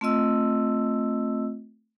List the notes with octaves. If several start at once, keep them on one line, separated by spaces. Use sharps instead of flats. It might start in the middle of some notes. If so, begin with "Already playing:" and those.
A3 C4 F4 D#5 E6